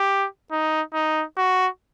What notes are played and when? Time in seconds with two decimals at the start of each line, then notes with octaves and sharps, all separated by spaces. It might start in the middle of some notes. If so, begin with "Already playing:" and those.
Already playing: G4
0.51 D#4
0.93 D#4
1.37 F#4